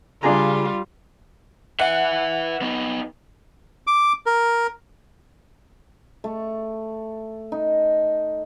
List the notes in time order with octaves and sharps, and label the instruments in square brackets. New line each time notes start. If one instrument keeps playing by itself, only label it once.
[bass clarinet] C#3 [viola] G3 F4 [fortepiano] D4 G#4 A#5
[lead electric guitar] B4 E5 [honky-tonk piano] F#5
[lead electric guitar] B3 D#4
[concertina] D6
A#4
[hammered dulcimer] A3
D#4